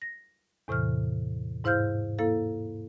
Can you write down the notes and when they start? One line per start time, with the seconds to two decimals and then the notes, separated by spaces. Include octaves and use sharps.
0.02 A#6
0.68 E2 A2 C3 E3 F6
1.64 G#2 E4 C5 F5 F6 G6
2.18 A#3 E4 A4 F5